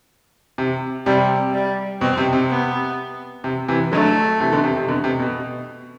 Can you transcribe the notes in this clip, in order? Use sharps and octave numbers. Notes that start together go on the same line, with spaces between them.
C3
C3 G3
G3
B2 C4
C3
C3
B3
C3
C3 E3
D3 F#3 A3
C3 E3
B2 D3
C3
C3
B2 D3
C3
B2